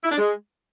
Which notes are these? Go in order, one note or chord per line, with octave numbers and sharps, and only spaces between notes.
E4
D4
G#3